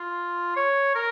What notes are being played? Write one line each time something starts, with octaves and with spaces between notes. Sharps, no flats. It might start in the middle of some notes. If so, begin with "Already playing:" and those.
Already playing: F4
C#5
A#4